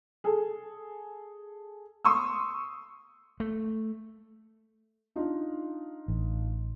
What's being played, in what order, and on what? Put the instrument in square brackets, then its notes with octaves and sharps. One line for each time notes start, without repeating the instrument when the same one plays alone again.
[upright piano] G#4 A4
C6 C#6 D#6 E6
[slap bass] A3
[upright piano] D4 D#4 F4
[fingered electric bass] A1